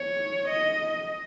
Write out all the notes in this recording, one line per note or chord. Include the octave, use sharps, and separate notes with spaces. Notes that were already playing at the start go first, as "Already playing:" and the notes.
Already playing: C#5
D#5